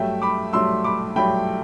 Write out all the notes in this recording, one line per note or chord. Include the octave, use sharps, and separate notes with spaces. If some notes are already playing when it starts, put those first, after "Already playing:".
Already playing: G2 F#3 A3 E5 G5
B5 D6
G2 F#3 A3 C6 E6
B5 D6
G2 F#3 A3 G5 B5